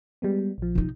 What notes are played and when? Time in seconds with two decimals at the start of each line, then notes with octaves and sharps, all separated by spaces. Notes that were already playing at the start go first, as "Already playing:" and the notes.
0.22 G3 G#3 B3
0.58 A#1 F3
0.75 C3 D#4